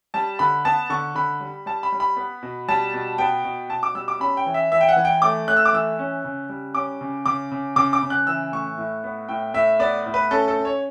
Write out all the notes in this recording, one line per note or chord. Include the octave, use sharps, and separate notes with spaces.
G3 A5
D3 B5
B3 A5
D3 C#6
D3 B5
G3
G3 A5
B5
G3
B5
B3
B2
G3 A5
B2
B3 G5
B2
B2 A5
D6
G3 E6
D6
C#4 B5
G5
E3
E5
E3 E5
G5
F#5
E3
G5
A3 D6
A3 F#6
E6
D6
E3 E6
C#4
C#3
G3
C#4 D6
C#3
C#3 D6
C#3
C#3 D6
D6
C#3
F#6
E3 E6
A2 C#6
A2
B3
A2 G5
A2 E5
B3 D5
A2
B4
C#4 A4
A4
C#4
C#5